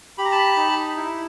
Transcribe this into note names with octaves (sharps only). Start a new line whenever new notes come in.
G4 B5
A#5
A5 B5
D#4
E4